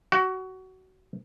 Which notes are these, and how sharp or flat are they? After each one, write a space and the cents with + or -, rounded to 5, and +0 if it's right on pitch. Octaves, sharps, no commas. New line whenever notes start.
F#4 +20